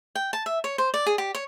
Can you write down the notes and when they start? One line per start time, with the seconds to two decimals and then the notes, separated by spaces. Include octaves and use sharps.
0.15 G5
0.33 A5
0.46 E5
0.64 C#5
0.78 C5
0.94 D5
1.06 G#4
1.18 G4
1.35 C#5